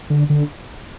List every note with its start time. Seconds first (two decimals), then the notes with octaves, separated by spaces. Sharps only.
0.10 D3
0.30 D3